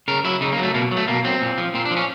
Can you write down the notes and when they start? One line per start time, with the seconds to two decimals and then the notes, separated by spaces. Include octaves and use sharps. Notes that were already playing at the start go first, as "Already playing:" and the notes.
0.08 C#3 A#4
0.24 F#3 E4
0.41 C#3 D#4
0.52 A#3
0.58 F#3
0.63 A3
0.74 B2 A#3
0.91 F#3
0.97 A3
1.08 B2 A#3
1.24 F#3 C4
1.41 A#2
1.58 F3
1.74 A#2 C4
1.85 D4
1.91 F3
1.97 C#4